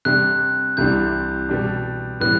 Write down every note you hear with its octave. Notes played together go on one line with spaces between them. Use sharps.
C3 G3 D4 F#6
C2 C3 E3 G3 D4 G6
B2 G3 D4
A2 E3 G3 B3 F#6